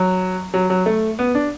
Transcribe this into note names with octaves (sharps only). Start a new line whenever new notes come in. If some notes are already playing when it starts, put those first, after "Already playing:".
Already playing: F#3
F#3
F#3
A3
B3
D4